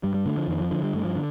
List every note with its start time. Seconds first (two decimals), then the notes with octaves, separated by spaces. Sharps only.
0.03 G2 G3
0.14 G3
0.26 D3 A3
0.37 F3
0.48 F2 D#3
0.60 F3
0.71 D3 F3
0.83 G3
0.94 G2 A3
1.05 F3
1.16 D3